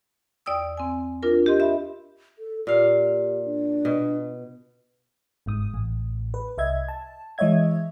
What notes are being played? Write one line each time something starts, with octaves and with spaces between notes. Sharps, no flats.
E2 D5 G5 D#6 E6
C4 G#5
D4 F4 A#4
G4 D#5 C6
E5 B5
A4
A#2 G4 F5
D4
B2
G1 G#2 D#6
A1 A2
B4
C2 D#5 E5 G#6
A5
E3 G#3 C#5 D#5 E5 G#6